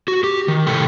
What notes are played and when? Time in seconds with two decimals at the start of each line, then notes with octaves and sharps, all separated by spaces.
0.08 F#4
0.24 G4
0.48 D#3
0.67 A2 C3 A4 G5